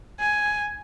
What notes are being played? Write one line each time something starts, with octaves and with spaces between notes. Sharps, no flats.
G#5